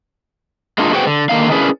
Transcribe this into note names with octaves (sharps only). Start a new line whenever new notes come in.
G#3 A#3 D4 D#4 F4
F#4 G#4 B4 C5 F#5 G5
D3
D3 D#3 A#3 D#4 F5
C#4 D4 E4 G#4 A#4 B4